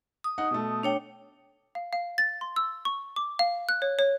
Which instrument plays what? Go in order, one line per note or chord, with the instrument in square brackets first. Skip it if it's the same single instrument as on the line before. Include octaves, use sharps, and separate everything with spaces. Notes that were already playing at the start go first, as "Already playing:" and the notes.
[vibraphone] D#6
[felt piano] D#4 F#5
B2 A3
[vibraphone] D4 C#5 G5
[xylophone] F5
F5
A6
C6
E6
C#6
D6
F5
F#6
C#5
C#5